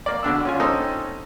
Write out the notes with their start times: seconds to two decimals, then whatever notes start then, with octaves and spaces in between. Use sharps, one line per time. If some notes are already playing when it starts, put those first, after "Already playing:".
0.06 A#3 D5
0.23 B2 D3 D4 E6
0.45 C#4 F4 G#5
0.60 C4 C#4 D#4 A4 D#5